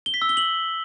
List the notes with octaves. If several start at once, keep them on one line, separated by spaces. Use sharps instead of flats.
G7
B6
E6
G7
F#7